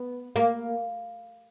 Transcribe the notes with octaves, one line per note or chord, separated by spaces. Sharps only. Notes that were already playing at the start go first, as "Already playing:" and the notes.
Already playing: B3
A#3